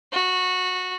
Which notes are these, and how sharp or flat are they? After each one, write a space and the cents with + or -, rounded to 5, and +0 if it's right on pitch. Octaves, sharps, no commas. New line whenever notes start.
F#4 -15